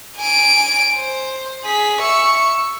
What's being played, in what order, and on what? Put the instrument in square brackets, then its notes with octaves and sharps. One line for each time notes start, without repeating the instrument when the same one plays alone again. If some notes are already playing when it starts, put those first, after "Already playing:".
[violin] G#5 D7
C5
G#4 B6
E5 C#6